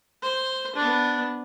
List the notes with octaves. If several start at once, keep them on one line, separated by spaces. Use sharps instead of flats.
C5
B3 D4